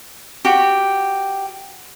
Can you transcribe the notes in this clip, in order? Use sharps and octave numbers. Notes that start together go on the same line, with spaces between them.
F#4 G4